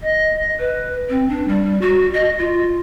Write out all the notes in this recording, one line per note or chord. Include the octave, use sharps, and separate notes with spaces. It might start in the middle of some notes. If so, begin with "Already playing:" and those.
D#5
B4
C4
D4
G3
F#4
D#5
F4